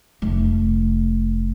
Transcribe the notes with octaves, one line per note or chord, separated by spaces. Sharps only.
F1 A3